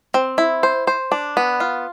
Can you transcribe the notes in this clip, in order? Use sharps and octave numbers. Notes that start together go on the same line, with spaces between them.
C4
E4
C5
C5
D4
B3
F4